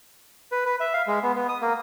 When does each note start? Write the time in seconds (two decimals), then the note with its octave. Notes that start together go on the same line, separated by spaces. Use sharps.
0.52 B4
0.65 B4
0.80 E5
0.94 F5
1.07 G#3
1.23 B3
1.36 B3
1.49 D#6
1.62 A#3